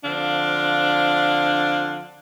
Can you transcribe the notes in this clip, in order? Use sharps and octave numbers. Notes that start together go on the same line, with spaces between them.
D3 F3 C4 D4 F5